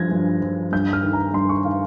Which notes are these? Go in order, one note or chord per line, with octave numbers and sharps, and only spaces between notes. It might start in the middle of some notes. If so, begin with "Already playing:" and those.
Already playing: G2 F3 G#6 A#6
G2
F3
G2 G6
F6
D#3
A#5
G2 C6
C#6
D#3 F5